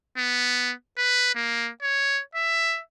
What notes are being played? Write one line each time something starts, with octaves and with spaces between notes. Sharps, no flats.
B3
B4
A#3
C#5
E5